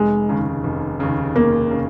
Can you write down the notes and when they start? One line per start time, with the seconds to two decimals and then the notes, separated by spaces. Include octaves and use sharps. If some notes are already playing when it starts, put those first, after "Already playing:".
Already playing: F1 G#3
0.29 D#2 C#3
0.64 F1
1.00 D#2 C#3
1.35 F1 A#3
1.71 C#3